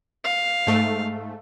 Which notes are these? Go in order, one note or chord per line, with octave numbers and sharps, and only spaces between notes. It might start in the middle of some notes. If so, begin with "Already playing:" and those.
F5
G#2 A3